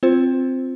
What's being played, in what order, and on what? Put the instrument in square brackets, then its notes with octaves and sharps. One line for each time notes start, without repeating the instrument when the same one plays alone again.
[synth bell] C4 F4 C5